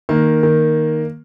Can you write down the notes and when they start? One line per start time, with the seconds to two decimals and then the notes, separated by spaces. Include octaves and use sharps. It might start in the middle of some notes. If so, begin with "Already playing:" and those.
0.09 D#3 A#3
0.43 D#3